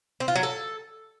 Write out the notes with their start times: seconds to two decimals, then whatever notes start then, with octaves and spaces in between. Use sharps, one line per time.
0.20 C4
0.28 F4
0.36 F#3
0.43 A4